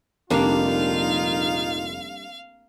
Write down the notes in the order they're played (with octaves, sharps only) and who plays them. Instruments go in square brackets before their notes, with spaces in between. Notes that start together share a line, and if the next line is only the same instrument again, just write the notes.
[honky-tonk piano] F1 [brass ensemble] A#1 D#4 F4 [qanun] G3 A#3 D4 [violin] F5